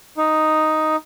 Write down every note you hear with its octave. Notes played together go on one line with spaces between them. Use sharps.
D#4